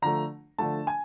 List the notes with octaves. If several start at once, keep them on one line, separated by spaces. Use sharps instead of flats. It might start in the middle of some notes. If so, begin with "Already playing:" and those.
D3 F3 A3 A#5
D3 F3 A3 A5
G#5